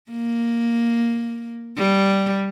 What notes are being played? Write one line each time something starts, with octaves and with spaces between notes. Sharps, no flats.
A#3
G3